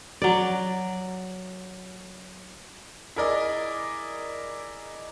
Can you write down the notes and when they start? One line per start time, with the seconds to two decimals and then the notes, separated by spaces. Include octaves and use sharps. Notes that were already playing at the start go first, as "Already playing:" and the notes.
0.22 F#3 D5
3.16 E4 G#4 A#4 D5 D#5